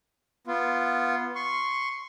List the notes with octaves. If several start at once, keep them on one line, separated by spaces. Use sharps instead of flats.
B3 F4
C6 C#6